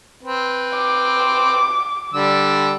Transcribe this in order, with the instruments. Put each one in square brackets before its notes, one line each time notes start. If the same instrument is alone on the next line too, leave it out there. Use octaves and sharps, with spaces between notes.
[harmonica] C4 B4
[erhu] D6
[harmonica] D3 G3 E6